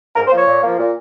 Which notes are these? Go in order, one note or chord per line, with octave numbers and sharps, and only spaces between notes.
G#2 A#4
C5
F3 A#3 C#5
A#2
F3 A#3
A#2